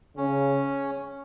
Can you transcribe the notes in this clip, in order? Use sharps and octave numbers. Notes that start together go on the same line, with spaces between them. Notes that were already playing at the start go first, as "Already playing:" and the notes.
C#3 C#4